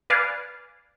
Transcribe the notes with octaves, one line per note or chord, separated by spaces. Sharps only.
B4 D5 F5 G#5